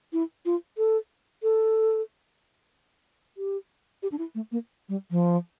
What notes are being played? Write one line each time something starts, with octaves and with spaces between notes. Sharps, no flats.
E4
F4
A4
A4
G4
G4
D4
E4
A3
A#3
G3
F3